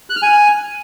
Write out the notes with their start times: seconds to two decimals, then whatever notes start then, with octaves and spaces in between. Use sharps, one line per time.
0.10 F#6
0.16 F6
0.22 G#5